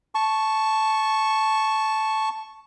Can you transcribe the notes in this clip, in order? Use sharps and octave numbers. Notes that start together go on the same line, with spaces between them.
A5 C#6